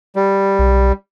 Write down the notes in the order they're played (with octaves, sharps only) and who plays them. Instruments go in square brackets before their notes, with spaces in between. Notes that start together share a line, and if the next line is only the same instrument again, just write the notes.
[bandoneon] G3
[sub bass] B1